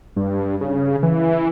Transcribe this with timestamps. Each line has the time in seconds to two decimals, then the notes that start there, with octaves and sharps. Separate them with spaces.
0.16 G2
0.61 C#3
1.03 E3